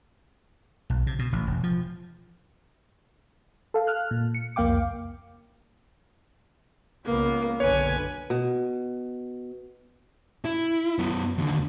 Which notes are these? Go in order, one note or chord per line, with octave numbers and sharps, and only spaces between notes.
B1
C3
B2
A1
E1
F3
A4 F5
F6 F#6
A#2
C#7
C2 F2 A#3 F5 G5 D6
C#2 A#3 B3
F#1 B1 D3 B4 C#5 G#5
B2
E4
F#2 B3
D#2 D3